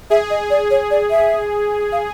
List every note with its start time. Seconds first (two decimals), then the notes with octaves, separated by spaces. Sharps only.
0.10 G#4 E5
0.30 D#5
0.50 D5
0.71 C#5
0.91 D5
1.11 E5
1.92 F5